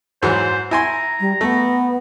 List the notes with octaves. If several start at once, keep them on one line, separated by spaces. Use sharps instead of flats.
G#2 E3 F#3 C5
E4 G#5 A#5 C6
G3
A3 B3